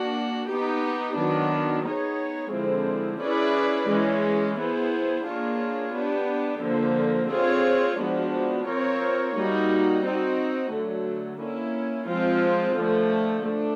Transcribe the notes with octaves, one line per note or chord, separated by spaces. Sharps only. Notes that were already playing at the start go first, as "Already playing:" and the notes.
Already playing: A#3 D4 F#4
B3 D#4 G4
D#3 F#3 B3 D4
B3 D#4 G#4 C#5
D3 F3 G#3 C4 E4
C#4 E4 G#4 B4 D5
E3 G#3 C#4
B3 E4 G#4 C5
A#3 D4 F4 G#4 C#5
B3 D4 G4
D3 F3 A#3
C4 F4 G#4 C#5
F3 G#3 B3 D4 F#4
C4 F4 A#4 C#5
G3 A#3 D#4 F#4
C4 D#4 F#4
D3 F#3 A3
A#3 C#4 E4
F3 G#3 C4 F4
D3 F3 A3
A3 D4